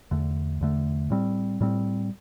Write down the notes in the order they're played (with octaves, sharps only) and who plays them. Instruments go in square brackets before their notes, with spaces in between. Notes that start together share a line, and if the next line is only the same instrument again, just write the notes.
[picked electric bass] E2 D3 A3
E2 D3 A3
A2 G3 C4
A2 G3 C4